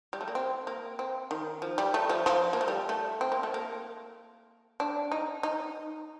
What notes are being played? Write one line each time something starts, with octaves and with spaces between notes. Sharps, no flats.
G3
A3
A#3
C4
A#3
C4
D#3
F3
G3
A3
F3
F3
A#3
A3
G3
A3
C4
A#3
A3
A#3
D4
D#4
D#4